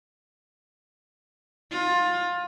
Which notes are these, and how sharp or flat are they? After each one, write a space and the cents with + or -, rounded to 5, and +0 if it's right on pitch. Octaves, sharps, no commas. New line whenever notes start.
F4 +20